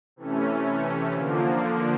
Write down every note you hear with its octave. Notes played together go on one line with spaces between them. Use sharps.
C3 E3 A3 C#4
D3 F3 A#3